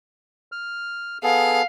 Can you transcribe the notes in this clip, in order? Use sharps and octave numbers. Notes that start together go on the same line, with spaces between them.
F6
B3 G#4 A4 F5